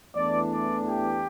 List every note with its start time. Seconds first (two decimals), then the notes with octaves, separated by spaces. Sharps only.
0.14 E2 E3 A3 D4 D5
0.51 D5
0.87 G4